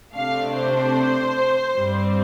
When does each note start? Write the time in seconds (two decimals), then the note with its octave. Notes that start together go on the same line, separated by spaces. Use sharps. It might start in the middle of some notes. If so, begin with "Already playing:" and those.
0.14 C3 A3 D4 F5
0.54 C5
1.76 G2 G3 C4